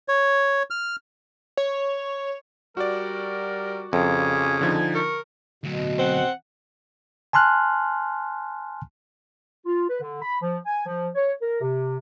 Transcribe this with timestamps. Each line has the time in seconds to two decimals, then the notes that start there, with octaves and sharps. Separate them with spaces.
0.08 C#5
0.70 F6
1.57 C#5
2.77 G3 F#4 A#4 D5
3.93 F2 C#3 G#5
4.61 D3 F3 D#4
4.95 A#4 C#6
5.63 D2 B2 F#3
5.99 C4 F#5
7.33 G#5 A5 C6 F6 F#6
9.66 F4
9.89 B4
10.01 D3
10.22 B5
10.42 F3
10.66 G#5
10.86 F3
11.15 C#5
11.42 A#4
11.61 C3